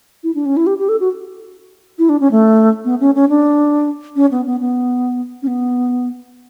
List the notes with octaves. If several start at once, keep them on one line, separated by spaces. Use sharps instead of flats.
E4
D4
C#4
E4
G4
G4
A4
F#4
E4
D4
C#4
A3
B3
C#4
C#4
D4
C#4
B3
B3
B3
C#4
B3